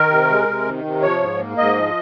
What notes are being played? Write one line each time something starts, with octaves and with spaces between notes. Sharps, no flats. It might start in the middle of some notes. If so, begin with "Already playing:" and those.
Already playing: D#3 A#4
C3
G#3
C3
D#3
C3
F3 C#5
G#2
A#3
G#2 D#5
F3